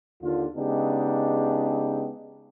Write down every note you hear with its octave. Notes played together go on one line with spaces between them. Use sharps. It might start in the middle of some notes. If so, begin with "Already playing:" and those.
D#2 D3 F4
C#3 G#3 B3 D4 D#4 G4